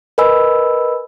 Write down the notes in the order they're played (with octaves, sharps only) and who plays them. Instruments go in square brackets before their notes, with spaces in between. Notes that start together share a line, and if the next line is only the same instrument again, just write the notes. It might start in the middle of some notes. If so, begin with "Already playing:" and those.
[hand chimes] A#4 B4 D#5 G#5 B5 E6